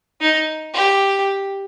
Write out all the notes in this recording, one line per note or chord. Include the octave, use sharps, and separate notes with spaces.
D#4
G4